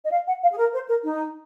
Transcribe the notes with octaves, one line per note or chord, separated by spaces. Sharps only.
D#5
F5
F#5
F5
G#4
A#4
C5
A#4
D#4